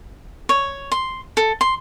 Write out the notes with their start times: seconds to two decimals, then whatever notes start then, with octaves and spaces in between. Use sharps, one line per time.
0.49 C#5
0.92 C6
1.37 A4
1.61 C6